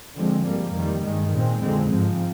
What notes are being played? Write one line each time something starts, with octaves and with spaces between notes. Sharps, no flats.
D3 F3 G#3 C4
G#2 G3 A#3
F2 D#3 G3
G2 D#3 G#3
A#2 G#3 C4
F2 D3 G#3 C4
G#2 F3 C4